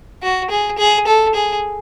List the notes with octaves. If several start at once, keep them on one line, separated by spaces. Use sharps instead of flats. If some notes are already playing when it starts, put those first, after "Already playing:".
F#4
G#4
G#4
A4
G#4